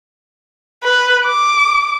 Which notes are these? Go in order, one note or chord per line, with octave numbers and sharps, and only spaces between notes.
B4
D6